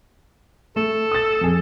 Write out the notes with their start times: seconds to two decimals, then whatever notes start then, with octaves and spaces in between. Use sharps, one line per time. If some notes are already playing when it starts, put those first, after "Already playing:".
0.76 A3 A4
1.12 D#6 A6
1.41 F2 G#4